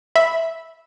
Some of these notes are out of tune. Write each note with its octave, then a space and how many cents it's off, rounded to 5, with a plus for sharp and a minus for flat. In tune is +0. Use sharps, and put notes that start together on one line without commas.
E5 +0 B5 +0